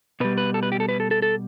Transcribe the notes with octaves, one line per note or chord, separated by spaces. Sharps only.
B2 G3 B4
B4
A4
B4
G4
A4
B4
A4
A4
A4